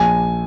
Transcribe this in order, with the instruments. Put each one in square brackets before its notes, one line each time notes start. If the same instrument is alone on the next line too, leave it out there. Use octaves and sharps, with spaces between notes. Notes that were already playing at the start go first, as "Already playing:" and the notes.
Already playing: [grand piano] A#1 G#5